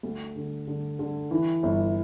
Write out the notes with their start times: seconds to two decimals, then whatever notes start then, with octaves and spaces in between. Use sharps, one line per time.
0.03 D2
0.36 D3
0.67 D3
0.99 D3
1.31 E3
1.63 G1